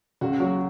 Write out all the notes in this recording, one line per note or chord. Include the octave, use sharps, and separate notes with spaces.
C#2 F#4
F#3 F#4